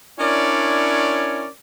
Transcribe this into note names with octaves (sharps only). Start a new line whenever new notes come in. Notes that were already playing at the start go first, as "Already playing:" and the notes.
C#4 D4 E4 A#4 C#5 D5